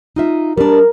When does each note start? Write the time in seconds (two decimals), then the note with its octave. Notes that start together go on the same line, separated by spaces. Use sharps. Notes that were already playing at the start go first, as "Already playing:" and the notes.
0.16 D#4 F4 E5
0.57 G3 D4 A#4